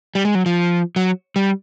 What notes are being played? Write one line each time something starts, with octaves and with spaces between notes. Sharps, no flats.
G3
G#3
F#3
F3
F#3
G3